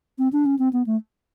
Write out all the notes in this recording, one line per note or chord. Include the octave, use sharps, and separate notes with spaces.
C4
D4
C#4
C4
B3
A3